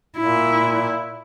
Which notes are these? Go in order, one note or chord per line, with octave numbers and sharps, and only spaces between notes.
A#2 E4